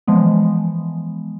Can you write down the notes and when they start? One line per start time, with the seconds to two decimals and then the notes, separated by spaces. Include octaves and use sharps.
0.07 E3 F3 G#3 B3